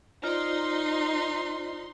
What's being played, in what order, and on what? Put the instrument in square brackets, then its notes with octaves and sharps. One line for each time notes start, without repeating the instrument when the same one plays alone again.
[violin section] D#4 C6 [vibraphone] F4 C5 D5